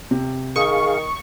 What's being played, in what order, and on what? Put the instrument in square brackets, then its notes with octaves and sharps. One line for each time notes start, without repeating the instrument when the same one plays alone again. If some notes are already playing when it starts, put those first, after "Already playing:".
[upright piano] C3
[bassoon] D#3 [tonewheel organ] G#4 F5 [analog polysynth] C#6 [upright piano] D#6